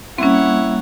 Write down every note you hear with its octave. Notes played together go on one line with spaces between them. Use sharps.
G3 A#3 C4 C#4 E4 C#5 F#5